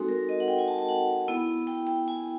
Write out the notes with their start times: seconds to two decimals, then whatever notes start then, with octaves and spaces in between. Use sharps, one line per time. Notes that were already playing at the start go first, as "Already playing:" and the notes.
Already playing: G#3 C4 D#4 F#4 A4
0.09 A#4
0.29 D#5
0.40 F#5
0.48 G5
0.58 G#5
0.68 A5
0.78 A5
0.88 F#5
1.28 B3 E4
1.67 G5
1.87 G5
2.08 G#5